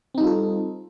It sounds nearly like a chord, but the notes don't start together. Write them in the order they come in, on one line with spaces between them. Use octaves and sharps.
C4 D#4 G3 F4 A4